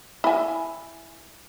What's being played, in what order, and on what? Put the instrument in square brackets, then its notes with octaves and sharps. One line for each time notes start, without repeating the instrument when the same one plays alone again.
[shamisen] E4 G#5